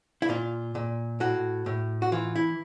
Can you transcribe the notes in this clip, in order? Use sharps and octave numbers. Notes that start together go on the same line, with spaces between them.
E4
A#2 F4
A#2
A2 F#4
A2
F#4
E3 F4
E4